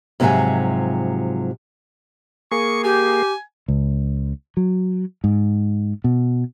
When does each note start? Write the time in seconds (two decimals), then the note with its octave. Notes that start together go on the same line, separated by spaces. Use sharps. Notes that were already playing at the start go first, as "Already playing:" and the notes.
0.20 G#2 C3 F3 F#3 E5 G#5
2.52 A#3 G#4 C#6
2.84 G4 G#5
3.68 C#2
4.57 F#3
5.24 G#2
6.04 B2